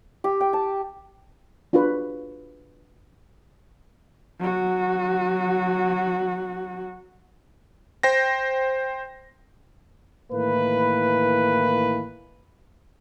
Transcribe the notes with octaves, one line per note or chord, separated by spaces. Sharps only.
G4
G5
A5
D4 F4 F#4 G#4 B4
F#3 F#4
C5 G5 A#6
A2 D#3 E3 A#3 B4